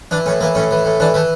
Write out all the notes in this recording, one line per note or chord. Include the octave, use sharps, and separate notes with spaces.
E3 D4
A2 C#4
E3 A#3
A2 C#4
E3
A2
E3 D4
E3 A3